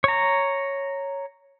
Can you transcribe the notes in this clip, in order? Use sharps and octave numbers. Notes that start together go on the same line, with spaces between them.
C#5 A#5